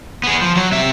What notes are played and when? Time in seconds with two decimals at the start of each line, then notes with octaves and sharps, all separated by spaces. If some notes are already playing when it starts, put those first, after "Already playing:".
0.24 B3 G#4
0.41 F3
0.56 F#3 C#5
0.72 C3 E5